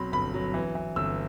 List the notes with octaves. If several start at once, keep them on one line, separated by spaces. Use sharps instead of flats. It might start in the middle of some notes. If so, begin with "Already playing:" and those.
Already playing: B1 F#3 C4 B5
G1 B5
F#3
E3
E3
G1 E6